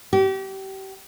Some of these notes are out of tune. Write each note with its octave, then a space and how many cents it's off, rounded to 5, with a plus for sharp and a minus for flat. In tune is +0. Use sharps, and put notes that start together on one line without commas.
G4 -30